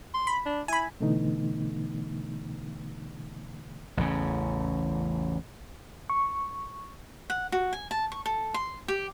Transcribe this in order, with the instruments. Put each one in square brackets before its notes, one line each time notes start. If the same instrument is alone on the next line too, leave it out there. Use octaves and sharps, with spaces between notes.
[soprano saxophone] C6
[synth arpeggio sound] B5
[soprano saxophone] D4
[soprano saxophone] E4 [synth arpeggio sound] G#5 B5
[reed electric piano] B2 D3 E3 A3 B3 D#4
[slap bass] A1 E2 C#3
[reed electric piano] C#6
[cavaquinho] F#5
F#4
G#5
A5
C#6
A4
C6
G4